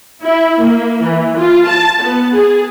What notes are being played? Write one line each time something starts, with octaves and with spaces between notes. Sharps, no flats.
E4
A#3
E3
F4
A5
B3
G#4